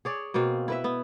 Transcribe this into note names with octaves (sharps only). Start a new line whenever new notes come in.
G#4 C#5 D5
B2 A#3 C4 F4
E4 B4 E5
B3